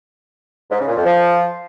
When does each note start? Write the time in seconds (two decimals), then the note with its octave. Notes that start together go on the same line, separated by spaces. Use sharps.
0.70 G#2
0.79 C#3
0.88 A#2
0.96 F2
1.05 F3